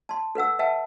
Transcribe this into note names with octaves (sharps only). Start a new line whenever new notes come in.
A5 C6
A4 B4 F#5 E6
B4 E5 F#5 G5 A5